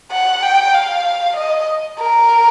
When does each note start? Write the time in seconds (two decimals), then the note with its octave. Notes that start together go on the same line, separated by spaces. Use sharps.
0.11 F#5
0.42 G5
0.74 F5
1.36 D#5
1.99 A#4